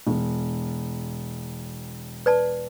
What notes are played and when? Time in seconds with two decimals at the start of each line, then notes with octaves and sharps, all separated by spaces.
0.07 E1
2.26 B4 D5 A5